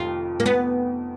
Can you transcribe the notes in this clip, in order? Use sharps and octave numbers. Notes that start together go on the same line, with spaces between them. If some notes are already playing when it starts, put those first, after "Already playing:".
Already playing: F1 F2 D#3 F4
A#3
B3